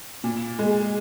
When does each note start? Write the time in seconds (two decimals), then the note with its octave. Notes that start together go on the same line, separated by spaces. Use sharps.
0.24 A#2
0.59 G#3